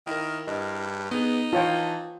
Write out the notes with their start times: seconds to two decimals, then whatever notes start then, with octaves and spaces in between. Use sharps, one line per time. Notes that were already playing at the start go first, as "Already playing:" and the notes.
0.07 D#3 E4 A#4
0.47 G2 D#5
1.11 B3 D#4 G#4
1.53 E3 F4 C#5 G5 A5